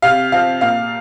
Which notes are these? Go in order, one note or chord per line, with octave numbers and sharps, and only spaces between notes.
C3 F5
F3 C4 F5
A#2 F5